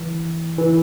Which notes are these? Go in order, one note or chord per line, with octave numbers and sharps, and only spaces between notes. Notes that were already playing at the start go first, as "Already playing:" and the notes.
Already playing: E3
E3